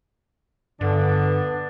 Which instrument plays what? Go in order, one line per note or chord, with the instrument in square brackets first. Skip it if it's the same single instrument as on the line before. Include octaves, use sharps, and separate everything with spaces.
[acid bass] G2 [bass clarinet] D3 [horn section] B3 D4